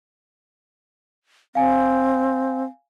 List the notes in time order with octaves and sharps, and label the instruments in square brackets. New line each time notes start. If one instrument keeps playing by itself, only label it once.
[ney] C4 [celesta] F5 G#5